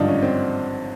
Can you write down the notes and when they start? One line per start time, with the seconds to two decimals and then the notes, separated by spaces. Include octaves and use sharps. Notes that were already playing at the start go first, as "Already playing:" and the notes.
Already playing: G#1 G2 D3 F3 D4 D#4
0.08 C#4
0.23 C4